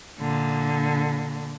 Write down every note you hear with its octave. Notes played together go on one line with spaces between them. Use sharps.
A#2 D3